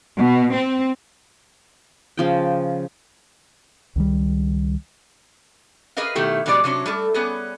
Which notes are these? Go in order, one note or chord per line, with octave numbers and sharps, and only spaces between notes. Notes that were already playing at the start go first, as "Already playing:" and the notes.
B2
C4
C#3 F3 G5
C#2 D#3 G3
G#4 A#4 B4 D#5 F5
B2 D#3 A3 E4 G4
B2 F3 G3 G#3 F4 D5
C3 F#3 C#4 D4
G3 A3 A4
G3 B3 C#4 G#4